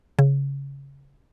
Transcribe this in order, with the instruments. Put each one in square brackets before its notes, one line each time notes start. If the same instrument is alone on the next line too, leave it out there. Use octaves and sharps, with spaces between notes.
[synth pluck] C#3